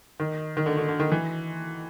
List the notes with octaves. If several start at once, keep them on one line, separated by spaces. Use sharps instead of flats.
D#3
D#3
D3
D3
D3
D#3
E3